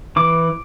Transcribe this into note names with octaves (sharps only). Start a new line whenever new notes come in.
E3 D6